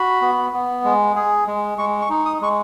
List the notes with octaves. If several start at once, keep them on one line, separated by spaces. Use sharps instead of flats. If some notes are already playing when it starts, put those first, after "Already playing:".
Already playing: F#4 B5
B3
B3
G#3
G#4
G#3
G#3 C#6
C#6
D#4
D#6
G#3 C#6